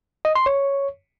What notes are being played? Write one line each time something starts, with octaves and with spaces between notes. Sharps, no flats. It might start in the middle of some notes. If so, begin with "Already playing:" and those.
D#5
C6
C#5